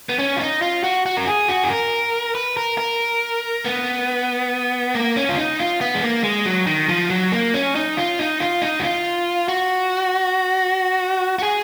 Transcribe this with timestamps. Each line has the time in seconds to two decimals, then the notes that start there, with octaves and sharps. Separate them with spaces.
0.09 B3
0.19 C#4
0.36 F4
0.40 D#4
0.62 F4
0.84 F#4
1.06 F#4
1.17 A#4
1.27 G#4
1.48 F#4
1.63 G#4
1.70 A#4
2.35 B4
2.57 A#4
2.78 A#4
3.65 B3
4.94 A#3
5.16 C#4
5.29 F4
5.37 D#4
5.59 F4
5.81 B3
5.94 G#3
6.03 A#3
6.24 G#3
6.46 F#3
6.67 D#3
6.89 F3
7.10 F#3
7.32 A#3
7.54 C#4
7.75 D#4
7.97 F4
8.19 D#4
8.40 F4
8.62 D#4
8.79 F#4
8.83 F4
9.48 F#4
11.39 F#4
11.43 G#4